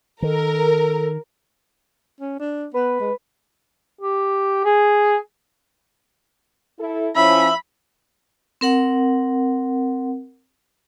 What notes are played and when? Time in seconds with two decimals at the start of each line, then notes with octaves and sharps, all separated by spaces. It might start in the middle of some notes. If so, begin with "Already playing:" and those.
0.22 D#3 A4 A#4
2.20 C#4
2.40 D4
2.74 B3 B4
3.00 G#3
4.01 G4
4.65 G#4
6.79 E4 A4
7.16 F3 C#4 E4 E5 B5
8.61 C4 A#4 F#5